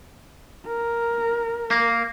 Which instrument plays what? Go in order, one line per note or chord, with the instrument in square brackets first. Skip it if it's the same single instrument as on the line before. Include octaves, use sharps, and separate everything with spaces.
[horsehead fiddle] A#4
[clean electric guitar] A#3